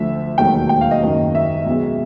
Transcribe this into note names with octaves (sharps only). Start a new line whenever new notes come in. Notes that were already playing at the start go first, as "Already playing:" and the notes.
Already playing: D2 D3 F3 A3 E5
E1 D#2 D#3 F#3 A3 G5
G5
F5
D#5
F#1 F#2 D#3
E5
B1 B2 G#3